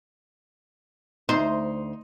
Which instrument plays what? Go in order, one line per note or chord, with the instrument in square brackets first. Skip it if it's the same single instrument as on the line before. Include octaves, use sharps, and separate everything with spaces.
[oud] D2 C5 [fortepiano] D#4 C6